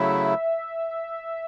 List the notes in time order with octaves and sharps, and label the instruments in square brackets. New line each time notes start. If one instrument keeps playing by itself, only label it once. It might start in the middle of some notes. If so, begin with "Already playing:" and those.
Already playing: [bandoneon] C#3 F#3 A3 E4 [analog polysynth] E5